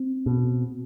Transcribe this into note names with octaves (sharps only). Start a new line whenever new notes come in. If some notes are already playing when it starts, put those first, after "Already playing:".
Already playing: C4
B2